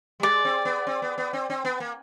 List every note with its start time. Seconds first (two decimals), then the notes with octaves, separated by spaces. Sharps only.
0.20 G3
0.23 G#3 D5
0.45 C4
0.65 B3
0.87 C4
1.02 B3
1.18 B3
1.33 C4
1.50 C4
1.65 B3
1.80 A#3